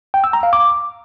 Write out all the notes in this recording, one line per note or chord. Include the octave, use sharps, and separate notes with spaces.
G5
E6
A#5
F5
D6